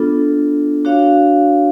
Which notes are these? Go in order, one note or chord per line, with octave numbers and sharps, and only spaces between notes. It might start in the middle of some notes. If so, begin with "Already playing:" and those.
Already playing: B3 D4 F4 A4
D4 F#4 C#5 F5